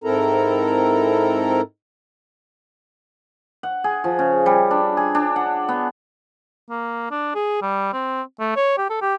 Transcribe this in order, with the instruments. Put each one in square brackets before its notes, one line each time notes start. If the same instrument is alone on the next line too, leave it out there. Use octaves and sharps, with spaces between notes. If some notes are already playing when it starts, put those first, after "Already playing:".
[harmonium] G#2 C4 E4 A4 A#4 A#5
[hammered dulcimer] F#5
G#4
F3
C#3
G3
D4
G#4
D4
F#5
B3
[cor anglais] A#3
D4
G#4
G3
C4
A3
C#5
G4
A4
G4